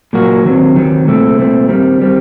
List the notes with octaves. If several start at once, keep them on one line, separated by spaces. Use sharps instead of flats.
A#2 F#3 A#3 F#4
D#2 D#3 F#3 C4
D#2 D#3 F#3 C4
C2 A#2 A3 C4
C2 A#2 A3 C4
D#2 D#3 G3 C4
D#3 G3 C4